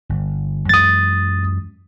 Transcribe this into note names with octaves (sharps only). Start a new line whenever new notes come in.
G1
F#2 E3 G#3 D#6 A6